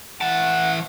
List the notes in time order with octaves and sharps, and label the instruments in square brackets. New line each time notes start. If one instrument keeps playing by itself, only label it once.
[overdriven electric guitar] E3 A5 [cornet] F#5